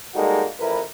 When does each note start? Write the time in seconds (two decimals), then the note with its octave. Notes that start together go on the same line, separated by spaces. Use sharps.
0.15 G3 G#3 A#3 D#4 F#4 A4
0.59 A1 F3 E4 A#4 B4